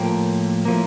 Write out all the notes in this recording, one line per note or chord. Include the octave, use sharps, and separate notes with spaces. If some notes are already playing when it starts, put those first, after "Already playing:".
Already playing: A2 F3 A#3 G5
A2 F3 A#3